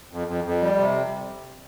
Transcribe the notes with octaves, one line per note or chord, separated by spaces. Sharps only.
F2
F2
F2
G3
C3